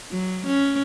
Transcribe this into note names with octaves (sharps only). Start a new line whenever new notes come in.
F#3
C#4